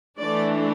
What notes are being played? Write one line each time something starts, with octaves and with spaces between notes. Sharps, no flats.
E3 A3 D4 D5